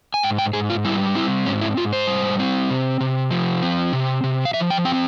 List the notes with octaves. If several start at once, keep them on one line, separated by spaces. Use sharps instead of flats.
G#5
G#2 G5
G5
G#2 G#4
F4
G3 E4
C4 E4
G#2 C#4
E4
G#2 F4
C5
G3
C4
C3
C3
F3
C4
C3
C3
F5
F3 E5
G5
C4 G5